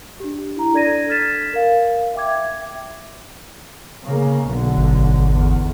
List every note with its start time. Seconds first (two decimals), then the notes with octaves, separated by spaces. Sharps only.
0.20 D4 G4
0.56 E4 A#5
0.73 D4 A4 D5 G#6 A#6 D#7
1.10 F6 G#6 A6 B6 E7
1.53 A#4 F5
2.15 E5 G5 D6 G#6
4.04 C#3 A#3
4.46 B1 D3
4.77 G#1
5.31 E2